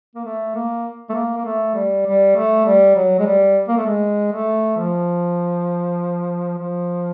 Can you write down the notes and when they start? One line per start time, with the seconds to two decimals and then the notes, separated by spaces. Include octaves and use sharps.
0.15 A#3
0.25 A3
0.55 A#3
1.09 A3
1.14 A#3
1.37 A#3
1.45 A3
1.75 G3
2.06 G3
2.36 A3
2.66 G3
2.96 F#3
3.19 G#3
3.26 G3
3.68 A#3
3.77 A3
3.86 G#3
4.32 A3
4.77 F3
6.58 F3